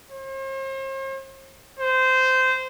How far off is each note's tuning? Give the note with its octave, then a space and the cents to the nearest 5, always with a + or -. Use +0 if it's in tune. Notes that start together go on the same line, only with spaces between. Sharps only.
C5 +45
C5 -15